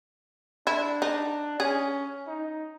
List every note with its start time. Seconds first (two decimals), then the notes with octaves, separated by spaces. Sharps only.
0.67 D4 E4
1.02 D#4
1.60 C#4 G#4
2.27 D#4